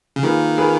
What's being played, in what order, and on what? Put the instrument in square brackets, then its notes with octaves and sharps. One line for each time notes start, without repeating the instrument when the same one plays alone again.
[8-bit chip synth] C#3
[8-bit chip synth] D#3 [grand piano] A#3 F4 G#4 B4
[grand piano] A#3 F4 G#4 B4